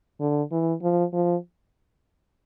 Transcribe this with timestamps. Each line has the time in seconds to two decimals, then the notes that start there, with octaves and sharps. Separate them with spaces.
0.20 D3
0.51 E3
0.82 F3
1.13 F3